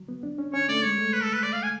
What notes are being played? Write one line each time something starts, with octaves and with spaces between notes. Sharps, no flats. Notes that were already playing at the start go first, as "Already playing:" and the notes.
Already playing: F#3
B3
D4
C#4
C#4 C#5
A3 D5
G#3 C#5
A3
B4
A4
B4
D5
F5
G#5